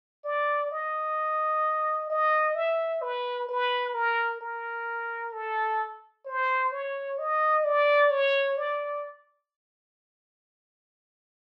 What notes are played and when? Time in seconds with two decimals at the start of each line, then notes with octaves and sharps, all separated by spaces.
0.25 D5
0.71 D#5
2.10 D#5
2.55 E5
3.02 B4
3.49 B4
3.95 A#4
4.41 A#4
5.33 A4
6.26 C5
6.72 C#5
7.19 D#5
7.64 D5
8.11 C#5
8.57 D5